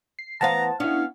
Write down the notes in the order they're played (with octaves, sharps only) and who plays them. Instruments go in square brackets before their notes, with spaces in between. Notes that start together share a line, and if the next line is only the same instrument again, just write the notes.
[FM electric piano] C7
[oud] E3 B3 F5 [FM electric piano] C5 F#5 A5 [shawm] A#5
[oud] B3 C#4 [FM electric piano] D4 E4 [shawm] F5